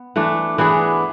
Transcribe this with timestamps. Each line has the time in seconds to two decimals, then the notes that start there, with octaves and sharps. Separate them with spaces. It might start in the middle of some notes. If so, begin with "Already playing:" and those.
Already playing: B3
0.16 E3 A3 D4
0.58 E3 B3 D4 G#4